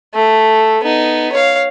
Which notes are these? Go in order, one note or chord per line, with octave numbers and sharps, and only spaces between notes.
A3
B3 D#4
C#5 F5